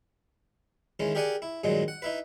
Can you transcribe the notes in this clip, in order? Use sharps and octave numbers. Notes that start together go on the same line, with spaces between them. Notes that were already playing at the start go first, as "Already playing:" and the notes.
D#3 E3 G#3 C#4
G4 G#4 A#4 D5 F#5 G#5
E4
G2 A#2 D#3 F#3 G#3
F#5
D#4 E4 B4